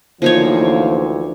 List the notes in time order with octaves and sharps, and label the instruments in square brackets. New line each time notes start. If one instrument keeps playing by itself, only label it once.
[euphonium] D2 [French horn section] E3 A#3 C5 [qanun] F3 D#4 C#5